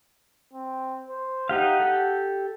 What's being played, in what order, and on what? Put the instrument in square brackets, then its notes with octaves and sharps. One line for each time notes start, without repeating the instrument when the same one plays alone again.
[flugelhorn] C4
C5
[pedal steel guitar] D#4 G4 F5 [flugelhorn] F#5
[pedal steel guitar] G4 A4